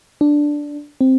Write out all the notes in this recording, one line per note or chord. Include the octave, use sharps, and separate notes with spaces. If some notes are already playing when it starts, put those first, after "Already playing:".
D4
C4